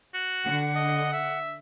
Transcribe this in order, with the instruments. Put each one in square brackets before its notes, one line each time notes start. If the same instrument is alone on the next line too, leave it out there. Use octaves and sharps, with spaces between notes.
[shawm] F#4
[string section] D3 [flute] F#5
[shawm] D#5
E5